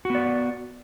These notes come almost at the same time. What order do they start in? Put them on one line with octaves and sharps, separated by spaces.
F#4 B3 D5